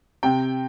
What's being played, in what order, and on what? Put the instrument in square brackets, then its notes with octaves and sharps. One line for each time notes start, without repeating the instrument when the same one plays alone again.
[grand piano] C3 G5